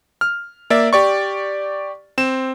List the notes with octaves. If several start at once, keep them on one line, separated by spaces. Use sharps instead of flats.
F6
A#3 D5 E5 A6
G4 D5 C#6
C4 E7